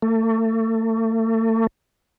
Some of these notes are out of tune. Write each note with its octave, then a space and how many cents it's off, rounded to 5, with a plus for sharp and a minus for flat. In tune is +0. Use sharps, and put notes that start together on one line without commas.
A3 +35